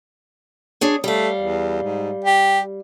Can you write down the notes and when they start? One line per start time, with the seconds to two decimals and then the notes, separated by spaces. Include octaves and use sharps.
0.81 D4 G#4 C#5
1.04 G3 A3 F5
1.39 E2
1.83 G#2
2.24 G4